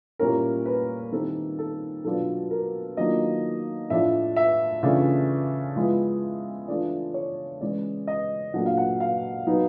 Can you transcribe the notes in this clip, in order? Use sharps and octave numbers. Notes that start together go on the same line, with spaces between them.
A#2 G3 A#3 C#4 E4 A#4
B4
D#3 G3 C4 E4 A4
A4
B2 F#3 B3 D4 F4 A4
A#4
D#3 F#3 A#3 D4 F4 D#5
A2 F3 A3 D4 E5
E5
C#3 E3 A3 D4 F4
F3 G#3 B3 E4
E3 A3 D4 F4 D5
C#5
E3 G#3 C#4 D5
D#5
A#2 F#3 A3 D4 F#5
F5
F#5
F5
F#3 B3 D#4